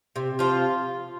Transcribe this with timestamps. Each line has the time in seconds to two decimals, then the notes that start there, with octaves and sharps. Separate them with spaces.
0.16 C3
0.39 F3 F4